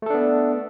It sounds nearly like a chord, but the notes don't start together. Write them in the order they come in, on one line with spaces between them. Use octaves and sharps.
A3 A4 D4 B3